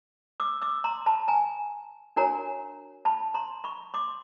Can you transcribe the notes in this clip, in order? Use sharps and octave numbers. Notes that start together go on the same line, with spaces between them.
D6 E6
D6 E6
A#5 C6
A5 B5
G#5 A#5
D4 F#4 A#4 C#5 G#5 A#5
A5 B5
A#5 C6
B5 C#6
C6 D6